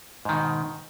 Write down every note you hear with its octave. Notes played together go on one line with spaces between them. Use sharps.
G#2 B2 D#3